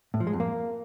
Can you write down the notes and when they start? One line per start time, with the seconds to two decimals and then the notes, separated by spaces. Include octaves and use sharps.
0.14 A2
0.20 F3
0.27 G#3
0.33 F2
0.40 A#3